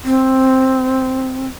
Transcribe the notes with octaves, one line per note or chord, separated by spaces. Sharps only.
C4